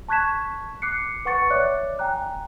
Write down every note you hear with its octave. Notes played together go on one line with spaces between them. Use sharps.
A5 C#6 F#6 G#6 B6 E7
D6 F#6 C7 C#7
B4 F#5 C#6 A6 C#7
C#5 D5 E5 D6 F#6
G5 G#5 A#5 F#6